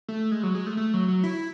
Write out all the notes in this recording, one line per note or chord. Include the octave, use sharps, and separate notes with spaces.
A3
G#3
F#3
G#3
A3
A3
F#3
F#3
E4